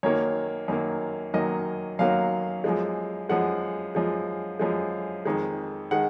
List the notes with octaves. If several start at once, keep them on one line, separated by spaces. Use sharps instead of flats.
F#2 D#3 F#3 A#3 C#5
F#2 D#3 F#3 A#3
F#2 D#3 F#3 A#3 D#5
F#2 D#3 F#3 A#3 F5
F#2 F3 G#3
F#2 F3 G#3 F#5
F#2 F3 G#3
F#2 F3 G#3
F2 D#3 G#3
D#3 G#3 F#5